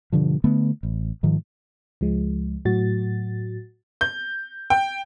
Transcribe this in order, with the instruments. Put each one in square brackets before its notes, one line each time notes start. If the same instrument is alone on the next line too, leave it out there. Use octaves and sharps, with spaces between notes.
[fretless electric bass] G2 B2 D3 F3
D3 A3 B3
A1
G#2 D#3 F3
[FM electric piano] C#2 F3 G#3
A2 F#3 F#4 A6
[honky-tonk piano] G6
G5